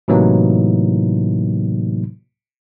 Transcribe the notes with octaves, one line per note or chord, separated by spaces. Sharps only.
A2 C3 E3 F#3 A#3 D#4